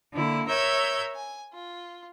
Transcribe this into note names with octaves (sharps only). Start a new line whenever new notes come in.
D3 A#3 E4
A#4 C#5 E5 E6 G6 G#6
G#5
F4